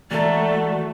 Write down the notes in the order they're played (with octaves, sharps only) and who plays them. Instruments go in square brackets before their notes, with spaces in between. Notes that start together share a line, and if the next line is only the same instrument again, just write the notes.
[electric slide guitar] E3 G#3 A#5 [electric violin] A3 [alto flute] F#4 [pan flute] D5